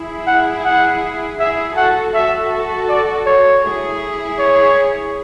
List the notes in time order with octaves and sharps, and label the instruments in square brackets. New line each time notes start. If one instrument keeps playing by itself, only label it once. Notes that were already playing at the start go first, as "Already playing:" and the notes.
Already playing: [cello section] E4 G#4
[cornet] F#5
F#5
[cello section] E4 G#4 [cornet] E5
[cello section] F#4 A4 [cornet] F#5
[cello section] F#4 A4 [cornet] E5
[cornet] D5
C#5
[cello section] E4 G#4
[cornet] C#5